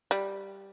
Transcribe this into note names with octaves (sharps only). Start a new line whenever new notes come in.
G3